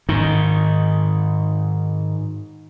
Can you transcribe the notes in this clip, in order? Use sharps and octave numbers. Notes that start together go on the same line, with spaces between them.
G#2 D#3